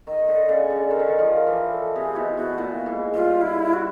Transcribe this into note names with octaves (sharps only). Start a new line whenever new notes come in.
D#3 D#5
D3
C#3 D5
D3
D#3 A#4
D3
D#3
F3
A#4
E3
A4
C3 G#4
B2 E4
B2 F#4
A#2 E4
G#2
G2 F4
E4
F#4